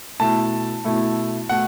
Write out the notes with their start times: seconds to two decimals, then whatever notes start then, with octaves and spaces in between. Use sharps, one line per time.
0.20 B2 A3 E4 A5
0.84 B2 A3 E4
1.49 B2 A3 F#5